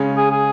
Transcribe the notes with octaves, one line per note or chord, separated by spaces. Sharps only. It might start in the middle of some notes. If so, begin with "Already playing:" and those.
Already playing: C#3 G#3 C#4
G#4
G#4